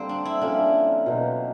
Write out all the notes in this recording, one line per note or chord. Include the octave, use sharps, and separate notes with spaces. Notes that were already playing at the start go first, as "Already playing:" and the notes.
Already playing: D3 G3 A#3 C4
D4
E4
D3 F3 A#3 C#4 D4
B2 F#3 A#3 D#4